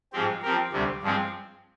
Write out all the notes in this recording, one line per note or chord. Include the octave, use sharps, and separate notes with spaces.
G#2 F3 G#3 C4 G4
F3 C4 G4 A#4
D2 C3 G3
G2 F3 G#3 C4